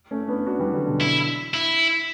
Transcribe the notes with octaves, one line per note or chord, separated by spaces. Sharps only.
A3 C#4
B3 D4
D4 F#4
E3 G3
D3 F#3
B2 D3
E4
E4